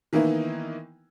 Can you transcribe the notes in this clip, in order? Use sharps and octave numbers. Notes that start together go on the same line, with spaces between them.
D#3 E3 A#3 B3 D#4 E4